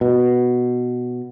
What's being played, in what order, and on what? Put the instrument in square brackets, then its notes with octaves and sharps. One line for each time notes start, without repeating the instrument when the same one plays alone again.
[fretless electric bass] B2